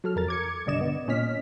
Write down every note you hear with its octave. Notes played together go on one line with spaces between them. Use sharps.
F#3 A4 F6
F2 A#4 A6
D6 G#6 C#7
B1 G2 D3 D5 D#5 E7
B3
A#2 C#4 D#5 F6 B6